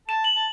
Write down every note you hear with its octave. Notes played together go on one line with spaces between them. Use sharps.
A5 E7
F#7
A5